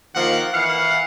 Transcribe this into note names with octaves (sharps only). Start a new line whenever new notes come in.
D#3 F3 A#3 F#5
E3 F5 F#5